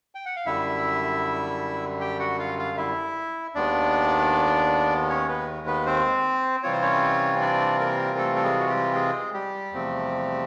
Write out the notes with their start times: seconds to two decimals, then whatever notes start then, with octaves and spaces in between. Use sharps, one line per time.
0.15 G5
0.26 F#5
0.36 F5
0.46 F#2 D3 G3 E4 E5
2.00 G4 G5
2.19 F#4 F#5
2.39 F4 F5
2.58 F4 F5
2.77 E4 E5
3.55 D#2 D#3 G#3 B3 D4 D5
5.09 C#4 C#5
5.28 B3 B4
5.67 B3 B4
5.86 C4 C5
6.63 C3 E3 G3 C4 F4 C#5
6.73 C5
6.82 C#4 C#5
7.41 D4 D5
7.79 A#3 A#4
8.18 A3 A4
8.36 A4
8.44 G#3 G#4
8.59 F#4
8.69 G3 G4
8.95 G#3 G#4
9.34 G3 G4
9.72 E2 C3 F3 A3 C4